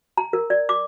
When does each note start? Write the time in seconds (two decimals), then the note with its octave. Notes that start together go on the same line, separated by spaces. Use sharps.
0.17 A#5
0.33 A#4
0.50 D5
0.69 D6